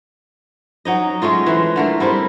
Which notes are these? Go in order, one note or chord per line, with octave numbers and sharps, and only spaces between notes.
F#3 D#4 D#5
G#3 A3 C#4 F4
E3 G#3
D3 A3 A#4
G3 C4 E4 A#4